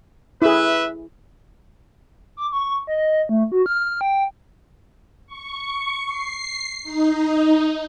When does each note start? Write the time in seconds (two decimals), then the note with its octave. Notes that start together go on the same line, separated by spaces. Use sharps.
0.42 E4 G#4 B4 E5
2.37 D6
2.52 C#6
2.87 D#5
3.29 A3
3.52 F#4
3.66 F6
4.01 G5
5.27 C#6
6.06 C7
6.83 D#4